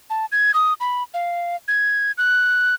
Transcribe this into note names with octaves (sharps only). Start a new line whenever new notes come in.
A5
G#6
D#6
B5
F5
G#6
F#6